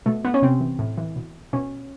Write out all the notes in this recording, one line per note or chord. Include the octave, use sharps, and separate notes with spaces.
B2 A3
B3
C#4
C3 C4
E3
A2
E3
B2
B2 C#4